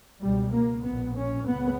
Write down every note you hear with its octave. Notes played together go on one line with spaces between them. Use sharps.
C#2 B2 G3
A#3
A#1 A#2 B3
C#4
C#2 C#3 B3